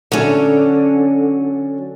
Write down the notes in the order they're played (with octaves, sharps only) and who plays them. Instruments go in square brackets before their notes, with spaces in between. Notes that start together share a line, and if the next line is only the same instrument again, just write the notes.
[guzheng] D3 [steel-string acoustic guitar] F#3 C#4